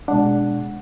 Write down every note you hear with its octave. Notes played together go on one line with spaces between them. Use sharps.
B2 G#3 D4 F#5